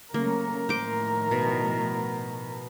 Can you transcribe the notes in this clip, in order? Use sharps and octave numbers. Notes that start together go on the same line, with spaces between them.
C#3 F#3 A3 A#3 A#4
A2 D#3 F3 C5 D6
B2